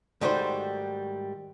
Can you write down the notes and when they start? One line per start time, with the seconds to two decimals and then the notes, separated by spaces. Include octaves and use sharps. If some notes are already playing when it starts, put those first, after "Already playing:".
0.21 G#2 D#3 G3 A3 F#4 C5